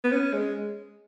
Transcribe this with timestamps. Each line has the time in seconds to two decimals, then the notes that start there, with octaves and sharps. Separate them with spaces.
0.04 B3
0.12 C#4
0.33 G#3